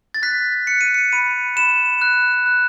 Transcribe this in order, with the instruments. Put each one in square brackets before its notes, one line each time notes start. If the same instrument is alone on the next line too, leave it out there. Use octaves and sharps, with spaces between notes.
[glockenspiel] A6
F#6 B6
F#6 C#7
D#7
C#7
B5 D#7
B5 E7
F#6
F#6